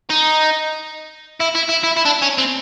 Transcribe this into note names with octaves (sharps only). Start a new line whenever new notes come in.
D#4
E4
E4
E4
E4
E4
D4
C#4
C4